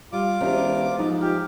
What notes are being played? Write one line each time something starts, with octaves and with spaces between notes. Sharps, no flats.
G3 F4 D6
E1 C#4 G4 A#4 C5
G#2 F3 F#3
F4 G4